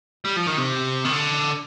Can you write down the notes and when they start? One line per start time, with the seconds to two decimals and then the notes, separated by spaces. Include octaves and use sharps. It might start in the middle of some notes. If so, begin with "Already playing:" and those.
0.25 G3
0.36 F3
0.47 D#3
0.58 C3
1.05 D#3
1.12 D3